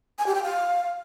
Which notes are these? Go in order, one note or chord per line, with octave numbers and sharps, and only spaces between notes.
G#5
G4
G5
F5